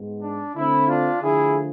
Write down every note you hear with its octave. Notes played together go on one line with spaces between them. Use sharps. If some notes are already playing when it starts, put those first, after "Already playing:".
Already playing: G#2 G#3 B3
D4
D3 A3 C4 E4
D4 F4
D3 F3 A3 E4 G#4